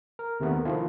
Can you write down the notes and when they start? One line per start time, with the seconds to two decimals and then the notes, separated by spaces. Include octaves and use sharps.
0.19 A#4
0.40 D#2 C3 D#3 A3 B3 B4
0.65 D#3 F3 E4 F4